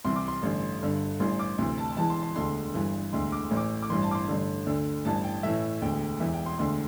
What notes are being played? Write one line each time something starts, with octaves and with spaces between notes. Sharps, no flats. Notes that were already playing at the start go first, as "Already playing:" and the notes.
C2 C3 E3 C6
D6
C6
A1 G2 D3
G1 G2 D3
A1 G2 E3 C6
D6
D2 C3 E3 C6
A5
E1 E2 E3 A5
C6
C6
E1 D2 D3 C6
G1 G2 E3
E1 D2 D3 C6
D6
A1 A2 E3
D6
D6
A1 G2 E3 C6
A5
D6
C6
A1 G2 D3
D2 D3
A1 G2 E3 A5
G5
A1 A2 E3 E5
E1 D2 D3 G5
E1 E2 E3 E5
G5
C6
E1 D2 D3 C6